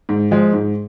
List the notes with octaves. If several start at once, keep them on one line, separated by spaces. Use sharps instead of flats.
G#2
F3 G#3
G#2